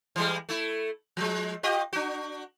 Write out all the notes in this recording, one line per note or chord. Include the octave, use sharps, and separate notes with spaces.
E3 G3 G#3
A3 E4
F3 G#3
F4 G4 D#5
D4 F#4